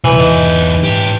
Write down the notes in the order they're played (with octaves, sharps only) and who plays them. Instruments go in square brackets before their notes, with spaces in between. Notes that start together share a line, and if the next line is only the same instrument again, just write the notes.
[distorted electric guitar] C2 [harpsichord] E3
[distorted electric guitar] E2 D#4
G#2 G4